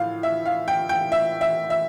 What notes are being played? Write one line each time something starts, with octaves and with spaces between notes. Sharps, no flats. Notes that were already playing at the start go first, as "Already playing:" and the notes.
Already playing: A2 F3 F5
E5
F5
G5
G5
E5
E5
E5